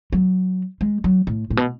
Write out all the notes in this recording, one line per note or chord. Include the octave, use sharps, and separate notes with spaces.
F#3
G#3
F#3
A2
A2
B2